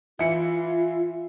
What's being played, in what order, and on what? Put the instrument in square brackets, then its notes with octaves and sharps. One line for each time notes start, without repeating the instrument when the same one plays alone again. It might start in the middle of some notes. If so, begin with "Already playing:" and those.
[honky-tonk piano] E3 E4 C#7 [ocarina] F4